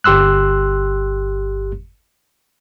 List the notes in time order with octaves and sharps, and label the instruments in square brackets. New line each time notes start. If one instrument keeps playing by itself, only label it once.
[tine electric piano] G1 G4 C6 E6 F#6